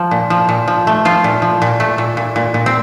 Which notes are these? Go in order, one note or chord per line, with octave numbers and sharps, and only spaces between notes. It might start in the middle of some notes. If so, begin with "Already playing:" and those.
Already playing: F3
A#2
F3
A#2
F3
A3
F3 F4
A#2
F3
A#2
A3
A#2
A#2
A#2
A#2
C4